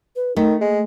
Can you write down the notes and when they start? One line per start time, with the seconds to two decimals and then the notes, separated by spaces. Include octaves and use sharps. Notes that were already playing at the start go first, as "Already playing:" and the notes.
0.16 B4
0.36 D#3 A3 D#4
0.61 G#3 A#3